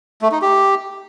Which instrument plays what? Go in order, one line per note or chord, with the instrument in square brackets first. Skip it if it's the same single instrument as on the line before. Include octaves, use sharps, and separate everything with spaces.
[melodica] A3
D#4
G4